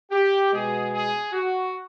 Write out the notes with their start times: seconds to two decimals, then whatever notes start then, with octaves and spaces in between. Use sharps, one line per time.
0.11 G4
0.52 B2 G#3 G#4
0.92 G#4
1.33 F#4